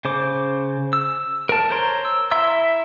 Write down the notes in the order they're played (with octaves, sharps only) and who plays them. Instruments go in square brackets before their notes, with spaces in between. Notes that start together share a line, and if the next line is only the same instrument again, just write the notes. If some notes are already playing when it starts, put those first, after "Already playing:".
[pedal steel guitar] C#3 C5 D6
E6
A#4 A5
C5 C#5 A#5 C6
E6
E4 E5 A#5 C6 E6